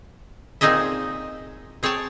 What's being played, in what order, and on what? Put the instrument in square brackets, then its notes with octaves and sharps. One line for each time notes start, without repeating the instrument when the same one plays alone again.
[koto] A#2 C4 D#4 G#4 D#5 E5
C4 G#4 C#5 G5 A5